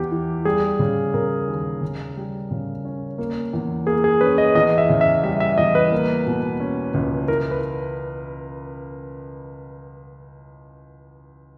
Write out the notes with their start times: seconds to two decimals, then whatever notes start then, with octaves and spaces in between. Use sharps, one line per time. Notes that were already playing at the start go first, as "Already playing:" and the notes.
Already playing: E2 E3 G4
0.11 E3
0.45 G3 G#4
0.79 C#3
1.14 C#3 A#4
1.48 D#2
1.81 C#3
2.17 G3
2.51 C#3
2.85 C#4
3.18 A#3
3.53 E2
3.86 A#3 G#4
4.04 G#4
4.21 C#4 B4
4.38 D#5
4.55 E2 D#5
4.78 E5
4.90 C#3
5.01 E5
5.24 G3 E5
5.40 E5
5.58 E2 D#5
5.75 B4
5.92 A#3
6.26 B2
6.60 C#4
6.94 C#2
7.28 E4 A#4
7.51 B4